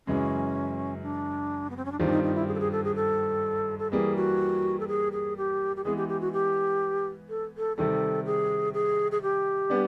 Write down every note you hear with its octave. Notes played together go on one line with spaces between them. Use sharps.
F#2 C#3 E3 G#3 C#4
D4
B3
C4
C#4
D4
G2 D#3 G3 C4 D#4 F4
D4
D#4
D#4
E4
G#4
A4
G#4
A4
G#4
A4
A4
E3 G3 A#3 G#4
F#4
A4
G#4
G#4
G4
G4
E3 G#3 B3 G#4
G4
G4
F#4
G4
A4
A4
C3 D#3 G3 A4
G#4
G#4
G#4
G4
G3 B3 D4